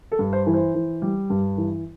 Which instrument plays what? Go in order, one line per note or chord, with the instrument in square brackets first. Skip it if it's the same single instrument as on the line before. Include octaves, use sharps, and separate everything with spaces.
[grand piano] A4
G2
C5
E3
C5
E3
G3
G2
E3